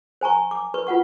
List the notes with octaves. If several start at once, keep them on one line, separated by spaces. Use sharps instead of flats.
C5 G#5 A#5 C#6
D6
B4 C#6
F4 B4 F#5 C#6